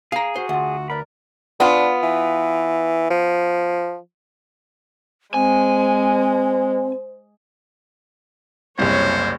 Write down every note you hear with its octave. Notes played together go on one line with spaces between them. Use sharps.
G#4 F5 A#5
F#4 A#4 C5
D2 F4 F#5
A#4 B4 D5 B5
B3 D4 F4
E3
F3
G#3 C4 C5 G#5
F#1 C2 C5 C#5